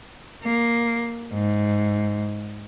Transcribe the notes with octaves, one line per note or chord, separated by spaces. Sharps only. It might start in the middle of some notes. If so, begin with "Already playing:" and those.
A#3
G#2